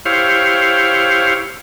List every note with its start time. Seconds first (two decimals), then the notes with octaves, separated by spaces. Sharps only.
0.06 E4 G4 C5 C#5 F5